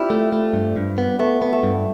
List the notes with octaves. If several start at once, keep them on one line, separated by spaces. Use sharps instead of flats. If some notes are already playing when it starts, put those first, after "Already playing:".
Already playing: C4 D4 E4 F4 G4
A3
A3
G2
G2
B3
A3 B3
B3
A3
G2